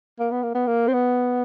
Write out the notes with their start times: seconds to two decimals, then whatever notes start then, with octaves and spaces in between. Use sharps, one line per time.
0.19 A#3
0.31 B3
0.43 A#3
0.55 B3
0.67 A#3
0.88 C4
0.94 B3